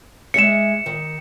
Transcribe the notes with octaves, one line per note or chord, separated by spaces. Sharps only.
G#3 G#4 E5 C#7 E7
D#3